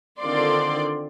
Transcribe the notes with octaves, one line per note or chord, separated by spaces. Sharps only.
D3 D#3 C4 F4 D5 C6